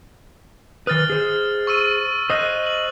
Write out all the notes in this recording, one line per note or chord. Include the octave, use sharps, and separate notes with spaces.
D#3 B4 D#6 F6 A6
G#4 C5
C#6 E6 D#7
C5 D#5 D#6 F#6
F#7